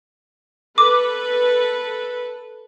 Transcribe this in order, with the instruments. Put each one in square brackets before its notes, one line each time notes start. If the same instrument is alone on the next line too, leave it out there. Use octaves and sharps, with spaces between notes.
[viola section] A4 B4 [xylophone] D6